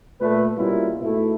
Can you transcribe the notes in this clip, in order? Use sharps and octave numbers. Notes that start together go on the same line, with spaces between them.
A#2 A3 B4
B2 G3 A#3 C#4 E4 F4
G#2 B2 A3 E4